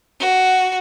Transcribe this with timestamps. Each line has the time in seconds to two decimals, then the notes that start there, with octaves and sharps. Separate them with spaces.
0.20 F#4